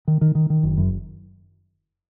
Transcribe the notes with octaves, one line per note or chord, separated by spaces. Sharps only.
D#3
D#3
D#3
D#3
F#1
F#2